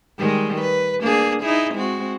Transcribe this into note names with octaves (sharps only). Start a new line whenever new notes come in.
D#3 G3 G#3
B4
A#3 D4 G#4
D#4 E4 G#4
G#3 C4 F#4